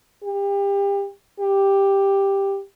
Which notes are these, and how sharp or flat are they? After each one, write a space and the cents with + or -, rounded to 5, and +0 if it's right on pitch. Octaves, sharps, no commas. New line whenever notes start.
G4 +30
G4 +5